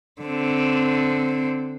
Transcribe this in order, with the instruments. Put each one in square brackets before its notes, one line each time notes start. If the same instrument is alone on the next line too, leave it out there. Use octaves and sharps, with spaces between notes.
[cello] D3 C4